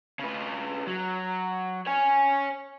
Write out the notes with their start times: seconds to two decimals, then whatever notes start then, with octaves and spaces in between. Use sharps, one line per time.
0.19 C#3 B4
0.87 F#3
1.86 C#5 G#5